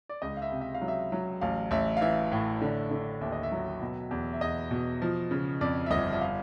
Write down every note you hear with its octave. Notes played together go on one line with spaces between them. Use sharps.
D5
C#2 D#5
F5
E5
C3
E5
F5
F#3
E5
F#3
A1 F5
A1 E5
F5
E3 E5
A2
D3
D3
D#2 E5
D#5
E5
F#3
B2
E2
E5
E2 D#5
B2
F3
C#3
F2 D5
E5
G1 D#5
E5
F5